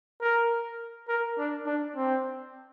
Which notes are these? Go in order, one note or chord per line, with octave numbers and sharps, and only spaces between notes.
A#4
A#4
D4
D4
C4